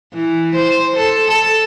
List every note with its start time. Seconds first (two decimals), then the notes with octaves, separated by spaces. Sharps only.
0.14 E3
0.56 C5
0.97 A4
1.28 A4